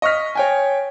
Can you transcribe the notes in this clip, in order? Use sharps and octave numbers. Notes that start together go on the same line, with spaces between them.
D#5 C#6 D#6 F6 B6
C#5 G5 G#5